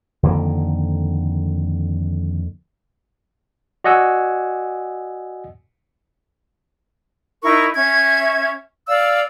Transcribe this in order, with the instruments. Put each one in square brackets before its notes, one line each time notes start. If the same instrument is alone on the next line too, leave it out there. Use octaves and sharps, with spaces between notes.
[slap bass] F2 D3 D#3 A#3
[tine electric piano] F#4 D5 D#5 F#5 G#5 E6
[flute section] D#4 E4 A#4 C#6
C#4 E5 G#6
D5 F5 E6